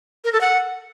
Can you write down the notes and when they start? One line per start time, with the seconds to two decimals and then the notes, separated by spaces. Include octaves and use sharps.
0.24 A#4
0.33 A4
0.41 F#5